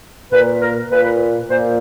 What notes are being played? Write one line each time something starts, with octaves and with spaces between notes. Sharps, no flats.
A#2 B4
A#4
A#2 B4
A#2 C5